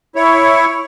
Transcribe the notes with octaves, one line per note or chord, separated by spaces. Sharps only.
E4 C#5